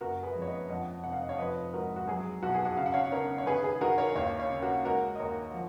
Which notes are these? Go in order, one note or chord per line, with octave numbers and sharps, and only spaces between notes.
F#1 F#4 A#4
G#4 B4
F2
C#5
B4 D#5
F2 D#5 F#5
F1 F#5
F5
D#5
C#5 F5
F3 B4 D#5
G#2 F#4 A#4
F#4
F#3 G#4
B1 F#4
G#4
F#4
C#3 F5
F#5
C#5 F5
C#3 A#4 C#5
C#5
D#3 G#4 B4
G#4
D#3 F#4 A#4
A#4 C#5
D#2 C#5 F5
C#5 F5
C#3
F#4 A#4
G#3 F#4 A#4
D#5
D#2 A#4 C#5
F3